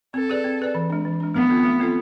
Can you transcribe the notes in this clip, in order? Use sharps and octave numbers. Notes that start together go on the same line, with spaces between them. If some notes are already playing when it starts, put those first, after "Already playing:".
C4 A4
G#4 B4 D5
C4
G#4 B4 D5
E3
G#3 D4
E3
G#3 D4
A3 B3
C4 F4 A4
A3
C4 F4 A4